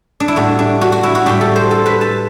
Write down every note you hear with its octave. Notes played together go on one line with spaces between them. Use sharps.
D4
E4
A2 G3 D4 F#4
D4
F#4
F#4
E4
F#4
A2 G3 D4 G4
A4
C5
A4
B4
A5